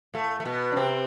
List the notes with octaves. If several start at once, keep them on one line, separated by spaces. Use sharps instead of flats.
A2 A3
A3
B2 B3
D4
C3 C4